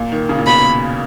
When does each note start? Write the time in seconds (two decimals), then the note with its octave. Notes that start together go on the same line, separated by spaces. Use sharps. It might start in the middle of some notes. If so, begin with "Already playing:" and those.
Already playing: A#2
0.12 D#3
0.29 C#3
0.38 A#2
0.46 B2 B5